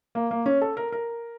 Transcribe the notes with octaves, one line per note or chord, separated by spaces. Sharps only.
A#3
A#3
C#4
A4
A#4
A#4